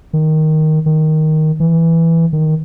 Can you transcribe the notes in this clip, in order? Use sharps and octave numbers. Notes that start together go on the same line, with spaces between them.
D#3
D#3
E3
D#3